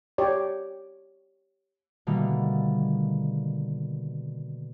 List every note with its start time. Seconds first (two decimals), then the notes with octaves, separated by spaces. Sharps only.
0.18 G4 C#5 D5
2.07 B2 D3 D#3 G3 A3 A#3